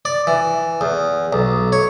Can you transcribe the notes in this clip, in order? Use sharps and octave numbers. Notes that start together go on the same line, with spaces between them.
D5
E3
E2
B1
C#5